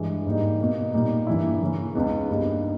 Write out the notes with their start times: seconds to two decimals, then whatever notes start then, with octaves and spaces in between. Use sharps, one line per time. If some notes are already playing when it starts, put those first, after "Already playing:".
Already playing: G2 E3 G#3
0.26 G#2 G3 A#3 D#4
0.60 B2 A#3 D#4
0.94 A#2 G3 A#3 D#4
1.27 G2 E3 A#3 E4
1.61 C#3 E3 A#3 C#4 E4
1.95 C#2 C#3 G#3 B3 D#4
2.30 G2 G3 A#3 D#4